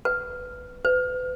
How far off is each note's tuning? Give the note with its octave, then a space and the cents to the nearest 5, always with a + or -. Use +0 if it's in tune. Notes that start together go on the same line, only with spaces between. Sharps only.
B4 +5
B4 +35